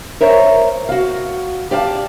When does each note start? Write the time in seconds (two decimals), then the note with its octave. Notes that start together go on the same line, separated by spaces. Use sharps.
0.21 A#4 C5 C#5 E5 A#5
0.89 F#4 F5
1.71 G4 D5 F5 A5